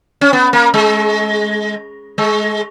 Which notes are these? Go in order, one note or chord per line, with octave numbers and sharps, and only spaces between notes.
C#4
B3
A#3
G#3
G#3